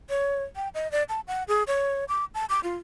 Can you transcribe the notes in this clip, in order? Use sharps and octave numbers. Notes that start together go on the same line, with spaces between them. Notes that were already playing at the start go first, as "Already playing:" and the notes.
C#5
G5
D#5
D5
A5
F#5
G#4
C#5
D6
A5
D6
F4